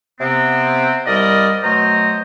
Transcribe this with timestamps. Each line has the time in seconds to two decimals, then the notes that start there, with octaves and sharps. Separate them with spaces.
0.20 C3 B3 C4
1.06 C2 G3 A#4 D5 D#5
1.63 B2 F#3 A3 C5 D#5 A#5